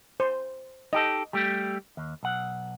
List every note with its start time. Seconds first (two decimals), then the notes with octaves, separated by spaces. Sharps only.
0.20 C5
0.93 D#4 G4 A4 D#5
1.33 G3 A3 G4
1.97 D#2
2.23 B1 F#5